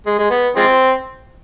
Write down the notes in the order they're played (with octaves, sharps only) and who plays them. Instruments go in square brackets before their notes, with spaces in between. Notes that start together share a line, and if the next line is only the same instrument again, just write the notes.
[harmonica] G#3
G#3
B3
F3 G#3 C4